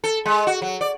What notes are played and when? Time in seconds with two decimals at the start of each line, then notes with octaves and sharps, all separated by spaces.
0.04 A4
0.26 G#3
0.47 F#4
0.62 F#3
0.81 D5